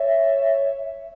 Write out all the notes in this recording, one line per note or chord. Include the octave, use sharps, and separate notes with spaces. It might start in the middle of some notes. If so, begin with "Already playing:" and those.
Already playing: C#5 E5